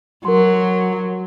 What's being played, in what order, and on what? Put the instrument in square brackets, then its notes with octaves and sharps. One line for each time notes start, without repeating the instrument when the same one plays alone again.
[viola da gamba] F#3 [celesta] A#4 C6